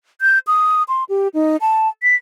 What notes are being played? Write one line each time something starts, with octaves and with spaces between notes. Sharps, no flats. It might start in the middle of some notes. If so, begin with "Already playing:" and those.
G6
D#6
C6
G4
D#4
A5
B6